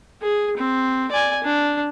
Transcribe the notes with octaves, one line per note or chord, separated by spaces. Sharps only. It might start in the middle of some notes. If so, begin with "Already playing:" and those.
G#4
C4
D5 G#5
D4